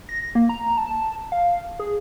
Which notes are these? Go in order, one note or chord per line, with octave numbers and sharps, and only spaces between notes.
A#6
A#3
A#5
A5
F5
G#4